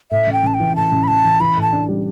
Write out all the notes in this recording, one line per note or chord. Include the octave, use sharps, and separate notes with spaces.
A2 E5
A1
G5
A1 A5
G5
E3
A2 A5
A1
B5
A1 A5
E3
E3 B5
A2 A5
D4
G3